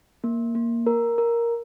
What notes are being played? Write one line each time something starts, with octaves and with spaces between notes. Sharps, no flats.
A#3
A#3
A#4
A#4